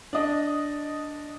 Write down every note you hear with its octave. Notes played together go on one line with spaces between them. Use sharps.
D4 D#5